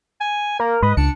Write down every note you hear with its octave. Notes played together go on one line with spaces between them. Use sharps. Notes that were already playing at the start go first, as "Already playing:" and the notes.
G#5
A#3 A#4
G#2 B4 D#5
C#2 D4 C#7